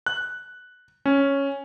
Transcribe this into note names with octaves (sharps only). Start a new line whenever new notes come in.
F#6
C#4